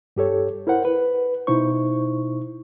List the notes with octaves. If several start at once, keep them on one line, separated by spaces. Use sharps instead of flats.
G2 G4 A4 C#5
E4 A#4 C5 F#5
B4
B2 D#4 E4 C5 C#6